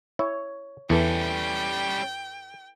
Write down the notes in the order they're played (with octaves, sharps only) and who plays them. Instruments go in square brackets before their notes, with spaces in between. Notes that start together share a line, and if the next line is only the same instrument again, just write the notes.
[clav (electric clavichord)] E4 [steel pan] C#5
[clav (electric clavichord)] E2 [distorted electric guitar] G3 C#4 [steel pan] E4 A4 B4 [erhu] G5